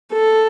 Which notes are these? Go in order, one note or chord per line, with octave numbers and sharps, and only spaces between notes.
A4